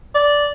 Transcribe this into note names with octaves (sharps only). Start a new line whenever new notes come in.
D5